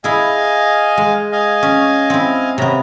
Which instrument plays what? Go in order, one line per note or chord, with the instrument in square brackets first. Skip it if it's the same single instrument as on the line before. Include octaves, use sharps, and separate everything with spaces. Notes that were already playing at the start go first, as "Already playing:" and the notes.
[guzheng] E4 G#4 [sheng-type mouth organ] D#5 F5 G#5
[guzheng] G#3
[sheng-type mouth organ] D#5 F5 G#5
[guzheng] C#4
C4 E4
[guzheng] C3 B3 [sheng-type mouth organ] C#4 A#5